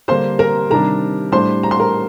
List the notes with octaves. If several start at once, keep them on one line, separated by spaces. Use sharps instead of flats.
D3 G3 A#3 D4 C5 C6
A#4 A#5
C3 D#3 G3 D4 A#4 A#5
A2 G3 D4 C5 C6
A#5
C6
A#4 A#5